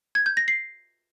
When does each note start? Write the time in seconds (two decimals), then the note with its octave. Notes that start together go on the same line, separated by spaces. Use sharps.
0.15 G#6
0.26 G6
0.37 A#6
0.48 C7